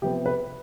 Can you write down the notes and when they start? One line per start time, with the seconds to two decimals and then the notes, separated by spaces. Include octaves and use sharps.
0.02 C3 F3 B3 G4
0.26 B4